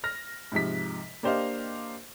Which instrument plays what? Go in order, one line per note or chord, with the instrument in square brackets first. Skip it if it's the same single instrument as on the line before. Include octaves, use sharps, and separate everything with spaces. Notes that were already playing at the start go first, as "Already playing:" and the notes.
[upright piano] F6 A#6
G#2 C3 F3 B6
A#3 D4 G4 C5 D#5 F5